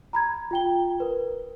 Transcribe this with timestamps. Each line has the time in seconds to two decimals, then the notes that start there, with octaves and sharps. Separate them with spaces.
0.13 A#5 B5 G#6
0.51 F4 G5 G7
1.00 A#4 B4